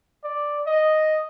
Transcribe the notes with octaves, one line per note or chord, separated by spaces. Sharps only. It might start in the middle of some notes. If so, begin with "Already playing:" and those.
D5
D#5